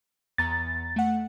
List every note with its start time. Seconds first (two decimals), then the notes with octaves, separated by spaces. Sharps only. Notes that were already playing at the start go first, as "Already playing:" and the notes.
0.38 E2 B3 A#5 A6
0.96 A3 F#5